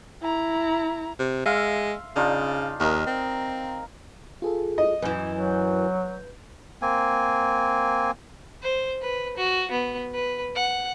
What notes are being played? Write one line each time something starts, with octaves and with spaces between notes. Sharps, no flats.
E4 A#5
C3
G#3 E5 F5 C6
C#3 D4 D#4 F4
D#2 A#4 D#5 A#5
C4
F4 G#4 A4
D#5
F#2 E3 B4 G6
F#3
A#3 C4 G#5
C5
B4
F#4
B3
B4
F#5